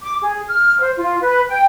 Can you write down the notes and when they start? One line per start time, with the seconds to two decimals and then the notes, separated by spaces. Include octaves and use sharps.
0.02 D6
0.22 G#4
0.49 F6
0.80 C5
0.97 F4
1.21 B4
1.49 G5